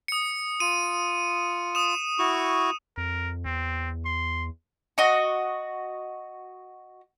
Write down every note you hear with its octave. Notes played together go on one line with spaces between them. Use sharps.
D#6 C#7
F4 D#7
D#6 E7
E4 F#4 C#6
F2 A#4
E2 C4
C6
F#4 D#5